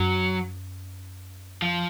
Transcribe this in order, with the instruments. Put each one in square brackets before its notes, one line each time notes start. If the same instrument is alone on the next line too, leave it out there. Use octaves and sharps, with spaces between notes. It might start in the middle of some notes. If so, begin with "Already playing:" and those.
Already playing: [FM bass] F#2 [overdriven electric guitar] F#3
[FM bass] F2 [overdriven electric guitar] F3